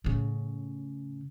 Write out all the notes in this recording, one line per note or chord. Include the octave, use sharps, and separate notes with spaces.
A2 C#3